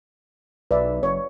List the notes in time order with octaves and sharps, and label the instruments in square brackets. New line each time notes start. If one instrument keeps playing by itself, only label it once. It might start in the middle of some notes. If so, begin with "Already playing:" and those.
[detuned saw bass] B1 [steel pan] B4 D5 E5
[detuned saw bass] F#1 [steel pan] C#5